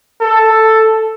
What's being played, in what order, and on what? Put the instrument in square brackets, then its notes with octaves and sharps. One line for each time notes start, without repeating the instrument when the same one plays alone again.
[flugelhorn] A4